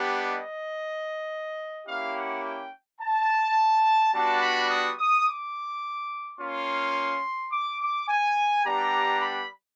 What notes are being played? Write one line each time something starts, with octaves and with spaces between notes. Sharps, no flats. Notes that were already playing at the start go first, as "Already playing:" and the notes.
Already playing: G3 B3 D4 G4
D#5
A#3 C#4 E4 G4 F5
F#5
G5
A5
G3 B3 D4 F#4 A5
B5
D#6
D#6
D6
A#3 C#4 F4 C6
D6
D6
G#5
G3 B3 D4 G4 A#5
B5